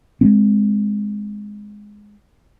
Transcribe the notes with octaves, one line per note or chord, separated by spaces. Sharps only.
G#3 B3 C4